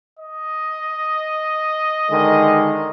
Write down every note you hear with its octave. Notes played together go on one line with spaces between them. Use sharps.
D#5
D3 D#3 G#3